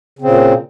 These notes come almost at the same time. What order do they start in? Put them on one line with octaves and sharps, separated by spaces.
C#3 C4 A#2